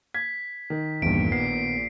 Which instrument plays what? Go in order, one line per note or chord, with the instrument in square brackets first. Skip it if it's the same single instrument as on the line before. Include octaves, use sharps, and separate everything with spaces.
[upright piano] G#6 [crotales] B6
[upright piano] D#3
[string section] A#1 A#2 [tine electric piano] E2 G2 [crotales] D7
[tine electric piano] B3 [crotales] C7